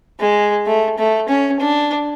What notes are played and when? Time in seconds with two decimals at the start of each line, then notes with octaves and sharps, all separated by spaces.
0.20 G#3
0.66 A3
0.98 A3
1.29 C#4
1.60 D4